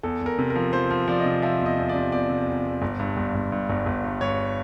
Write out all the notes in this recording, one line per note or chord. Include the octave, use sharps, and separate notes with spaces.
E2 A4
E2 A#4
C3
A#4
F3
F3 C5
F3
F3 D5
D#5
C3
F3 E5
E2
D#5
E2
D5
C3
E2 D5
C3
E2
E2
G1
G2
G1
G1
G2
G1
G1
G2
G2 C#5